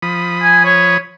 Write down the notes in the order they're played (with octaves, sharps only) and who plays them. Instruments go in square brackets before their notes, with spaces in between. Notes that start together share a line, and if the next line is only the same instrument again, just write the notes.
[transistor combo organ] F3 B5 D#6
[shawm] G#5
C#5